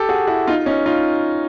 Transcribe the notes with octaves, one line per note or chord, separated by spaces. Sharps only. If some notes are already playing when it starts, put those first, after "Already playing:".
Already playing: G4 A4
F#4 G#4
E4 F#4
D#4 F4
C#4 D#4
D#4 F4